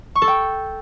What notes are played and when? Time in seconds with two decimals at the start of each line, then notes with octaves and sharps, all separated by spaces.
0.15 C#6
0.22 A4
0.28 G5